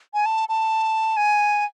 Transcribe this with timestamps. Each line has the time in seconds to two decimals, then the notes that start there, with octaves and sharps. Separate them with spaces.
0.14 G#5
0.26 A5
0.49 A5
1.17 G#5